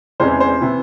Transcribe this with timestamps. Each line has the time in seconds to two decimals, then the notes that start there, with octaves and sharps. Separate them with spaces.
0.20 E2 C3 E3 G#3 C#4 C5
0.40 C5
0.61 C3 E3